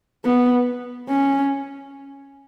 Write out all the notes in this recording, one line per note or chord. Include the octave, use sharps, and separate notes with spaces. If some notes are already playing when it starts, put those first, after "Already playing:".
B3
C#4